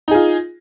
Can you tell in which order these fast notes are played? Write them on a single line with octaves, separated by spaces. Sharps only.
D#4 G#4 F4